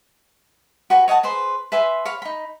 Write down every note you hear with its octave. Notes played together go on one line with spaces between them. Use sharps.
F#4 B4 G#5
C#5 D#5 F#5 A5
G#4 B4 C5 C6
B4 E5 G#5 C6
C#5 F5 B5
D#4 B5